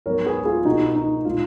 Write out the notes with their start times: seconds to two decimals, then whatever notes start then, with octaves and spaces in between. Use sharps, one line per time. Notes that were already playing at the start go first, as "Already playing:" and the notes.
0.06 G#2 F#3 B3 A#4 C#5
0.26 G#4 B4
0.46 F4 G#4
0.65 B2 A#3 D#4 F#4
0.96 D#4
1.25 A#2 G#3 D#4 F4